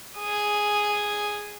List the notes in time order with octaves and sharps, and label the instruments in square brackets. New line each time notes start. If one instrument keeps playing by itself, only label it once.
[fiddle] G#4